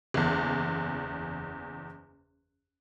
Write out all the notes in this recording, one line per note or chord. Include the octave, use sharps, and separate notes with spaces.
F#1 E2